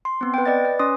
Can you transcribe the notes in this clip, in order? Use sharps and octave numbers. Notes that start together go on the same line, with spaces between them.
C6
B3 C4
B4 G5
B4 D5 D#5 A6
B4
C#4 C6 D#6